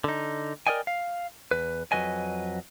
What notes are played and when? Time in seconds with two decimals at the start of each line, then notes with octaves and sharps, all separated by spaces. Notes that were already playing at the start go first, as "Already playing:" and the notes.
0.04 D3 D#4
0.67 A#4 B4 D5 D#5 G5 G#5
0.87 F5
1.51 E2 B4
1.92 F2 D#3 F#3 B4 D#5 G#5